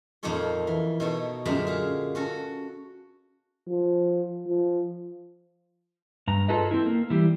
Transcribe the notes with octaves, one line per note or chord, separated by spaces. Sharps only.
F2 A#2 A#3 D#4 A4 C#5
E3
B2 D#4 A4 C#5 A5
F#2 A#2 D3 G#3 E5 A#5
G#4 F5
C#4 F#4 A4
F3
F3
G2 A#5
F4 G#4 A4 B4 D#5
C4 E4
A#3
E3 G3